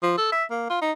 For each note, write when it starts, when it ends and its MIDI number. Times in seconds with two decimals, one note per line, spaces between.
0.03 0.16 53
0.18 0.29 69
0.32 0.44 76
0.50 0.68 58
0.70 0.81 65
0.82 0.92 63